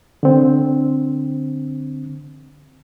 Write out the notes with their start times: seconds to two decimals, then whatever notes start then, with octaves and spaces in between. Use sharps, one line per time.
0.23 D3 C4